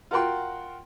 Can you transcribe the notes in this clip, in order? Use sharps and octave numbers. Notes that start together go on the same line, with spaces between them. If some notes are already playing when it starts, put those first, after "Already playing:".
F4 F#4 A#4 F#5 G5 C6